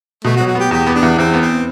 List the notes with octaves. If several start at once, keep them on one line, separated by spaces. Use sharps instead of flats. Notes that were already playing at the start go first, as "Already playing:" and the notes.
B2 A3
F#4
F#3
F#4
B3 G4
E2 G4
B3
D4
E2
E2 C4
B3
C4